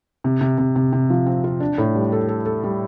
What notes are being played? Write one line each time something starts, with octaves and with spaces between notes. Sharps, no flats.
C3
C3
C3
C3
C3
F3
C4
F4
D4
A2
G3
A4
A4
A4
G3